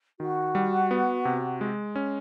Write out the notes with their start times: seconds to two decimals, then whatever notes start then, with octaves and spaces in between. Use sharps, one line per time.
0.20 D#3 F#4
0.55 G3
0.91 B3
1.25 C3
1.61 G#3
1.96 C#4